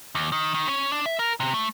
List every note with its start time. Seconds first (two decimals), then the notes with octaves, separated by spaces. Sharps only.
0.15 D#2
0.32 D#3
0.54 D#3
0.68 C#4
0.92 D4
1.06 E5
1.19 A#4
1.40 C3
1.54 A3